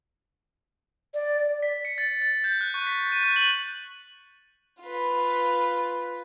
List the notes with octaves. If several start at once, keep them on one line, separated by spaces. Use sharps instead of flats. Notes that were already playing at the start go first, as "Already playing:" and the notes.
D5
B6
C#7
A6
A6
G6
F#6
C#6
B6
D#7
F#6
F#7
F4 B4